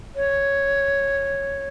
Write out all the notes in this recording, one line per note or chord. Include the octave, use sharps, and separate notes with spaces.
C#5